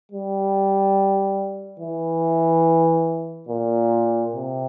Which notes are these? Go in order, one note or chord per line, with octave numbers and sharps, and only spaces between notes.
G3
E3
A#2
C3